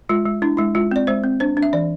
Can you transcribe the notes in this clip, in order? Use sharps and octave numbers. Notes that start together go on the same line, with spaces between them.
G#3 F4
G#3
D4 E4
G#3 E4
G#3 F4
C4 D5
G#3 C5
C4
D4 C5
D4
E5
E3 D5